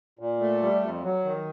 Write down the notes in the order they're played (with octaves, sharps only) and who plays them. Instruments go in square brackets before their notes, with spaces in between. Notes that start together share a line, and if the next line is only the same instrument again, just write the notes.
[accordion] A#2
A3
G3
F2
F#3
D#3